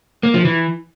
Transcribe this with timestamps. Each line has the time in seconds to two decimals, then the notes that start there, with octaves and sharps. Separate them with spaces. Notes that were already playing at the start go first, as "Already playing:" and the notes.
0.23 A#3
0.34 F3
0.45 E3